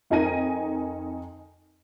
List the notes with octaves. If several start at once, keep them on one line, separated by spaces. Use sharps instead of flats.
F2 D#4 A#4 G#5 A#6 D#7